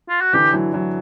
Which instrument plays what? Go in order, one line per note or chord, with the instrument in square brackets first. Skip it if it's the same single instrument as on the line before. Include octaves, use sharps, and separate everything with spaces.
[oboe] F4
F#4
[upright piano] D3 E3 [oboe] G4
[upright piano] E3 F#3
E3 F#3